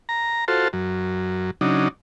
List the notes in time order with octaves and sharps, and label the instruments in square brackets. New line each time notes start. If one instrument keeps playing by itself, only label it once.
[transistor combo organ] A#5
F4 F#4 A4 C5
F#2
C#3 F#3 D4 D#4